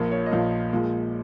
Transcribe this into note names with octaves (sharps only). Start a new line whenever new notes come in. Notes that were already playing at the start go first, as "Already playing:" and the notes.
Already playing: A#1 A#2 F3 A#3
C#5
D#5
A#1 A#2 F3 A#3 F5
A#2 F3 G#3